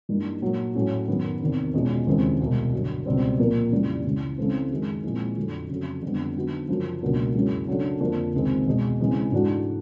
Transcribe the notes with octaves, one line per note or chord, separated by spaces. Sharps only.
G2 E3 G3 A#3 D#4
A#2 F#3 A#3
A2 F#3 A3 C#4 E4
F#2 D#3 F#3 B3
E2 C3 D#3
E2 B2 G#3 C#4 F4
D#2 C#3 E3 G#3 C4
C2 B2 G#3
G2 D3 F#3
C#2 B2 G3 C4
A#2 F3 A#3
F2 C#3 E3 G3
C#2 C#3 E3
C#3 E3 A3 C4
F#2 D#3 G#3
A#2 F3 G#3 C4 E4
F2 D3 F#3 A3
F2 C#3 F#3 A3
F2 D3 G3 B3
D3 F#3 B3 D#4 F#4
F#2 C#3 F3
C#2 B2 F#3 A#3 D4
F#2 C#3 E3 G#3
C#3 F#3 A3 D4
F2 D3 F3 A#3 D4
C#2 C3 D#3 G#3 C4
E2 B2 G#3
C#3 E3 G#3 C4
G#2 E3 A3 D4 F#4